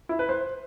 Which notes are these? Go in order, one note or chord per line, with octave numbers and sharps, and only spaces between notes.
E4
B4
C5